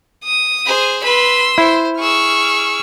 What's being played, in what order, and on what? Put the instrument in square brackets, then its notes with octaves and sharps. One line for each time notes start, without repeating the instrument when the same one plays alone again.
[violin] D#6
[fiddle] G#4 C5
[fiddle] B4 B5 [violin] C6 E6
[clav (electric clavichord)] E4 [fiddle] C5
[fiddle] G#4 E6 [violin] C#6 F6